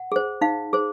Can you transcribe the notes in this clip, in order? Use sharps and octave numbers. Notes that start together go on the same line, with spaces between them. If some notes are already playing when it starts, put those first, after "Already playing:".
Already playing: F#5
G#4 C5
D#4 F5
G#4 C5